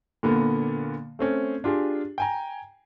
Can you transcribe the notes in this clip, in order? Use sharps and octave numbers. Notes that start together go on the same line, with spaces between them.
A#2 D3 A#3 B3
A3 C4 C#4
D4 F4 G4 G#4
G5 G#5 A#5